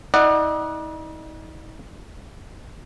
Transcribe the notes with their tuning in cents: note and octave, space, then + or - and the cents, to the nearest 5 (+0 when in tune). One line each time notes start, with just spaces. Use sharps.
D#4 +40 D5 +40 F#5 +0